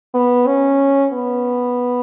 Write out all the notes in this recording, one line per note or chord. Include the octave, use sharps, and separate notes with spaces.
B3
C#4
B3